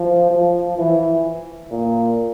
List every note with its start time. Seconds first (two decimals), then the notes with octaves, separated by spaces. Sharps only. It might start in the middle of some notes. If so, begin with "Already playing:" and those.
Already playing: F3
0.31 F3
0.78 E3
1.71 A#2